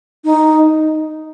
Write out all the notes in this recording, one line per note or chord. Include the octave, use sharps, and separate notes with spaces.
D#4